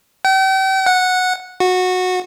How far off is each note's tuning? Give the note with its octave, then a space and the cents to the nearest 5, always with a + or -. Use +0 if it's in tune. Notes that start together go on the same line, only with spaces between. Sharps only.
G5 -40
F#5 -10
F#4 -15